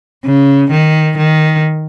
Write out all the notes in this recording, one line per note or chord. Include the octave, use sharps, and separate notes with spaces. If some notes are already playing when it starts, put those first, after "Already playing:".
C#3
D#3
D#3